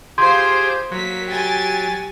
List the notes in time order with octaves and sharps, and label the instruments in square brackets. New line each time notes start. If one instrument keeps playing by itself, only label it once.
[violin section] F4 C5 [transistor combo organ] G4 G#4 [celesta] C6 G#6
[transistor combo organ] F#3 [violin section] A#3 B6
[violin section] G4 G#5 A6